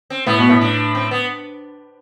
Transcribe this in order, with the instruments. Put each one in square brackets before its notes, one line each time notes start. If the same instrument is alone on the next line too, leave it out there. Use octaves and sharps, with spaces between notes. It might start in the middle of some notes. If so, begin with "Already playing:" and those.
[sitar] C4
[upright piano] A2 [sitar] B3
[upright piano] B2
A2
[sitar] D4
C4
B3